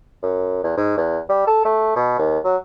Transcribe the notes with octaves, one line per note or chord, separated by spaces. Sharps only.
F#2
E2
G#2
E2
G3
A4
A3
B2
D#2
F#3